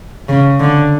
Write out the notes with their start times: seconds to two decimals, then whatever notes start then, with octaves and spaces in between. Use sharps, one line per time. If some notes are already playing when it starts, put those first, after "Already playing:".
0.29 C#3
0.60 D3